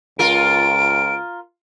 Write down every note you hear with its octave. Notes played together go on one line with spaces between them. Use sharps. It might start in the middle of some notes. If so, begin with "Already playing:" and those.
C#2 F4 A#4 D7